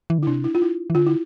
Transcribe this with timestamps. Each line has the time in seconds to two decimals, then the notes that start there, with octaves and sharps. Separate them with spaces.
0.10 E3
0.18 D3
0.23 E4
0.27 C3 D4
0.44 E4
0.55 F4
0.62 E4
0.90 E3
0.95 D3 F4
1.07 E4